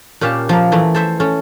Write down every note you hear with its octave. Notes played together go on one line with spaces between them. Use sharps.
A#2 C#4 G4 F5 A5
F3 A#3
E3 A3
A4 C5 E5
C#4 A4